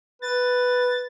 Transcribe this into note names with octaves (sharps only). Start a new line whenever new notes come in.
B4 A6